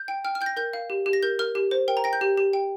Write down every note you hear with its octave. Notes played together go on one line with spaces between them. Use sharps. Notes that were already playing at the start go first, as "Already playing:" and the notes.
Already playing: G6
G5
G5 F6
F6
G5 G6
A#6
A#4 G6
F5
G4
G4
A#6
A#4 G6
A#4 F6
G4
C5
A#4 G5
A#5
G5 A#6
G6
G4
G4
G5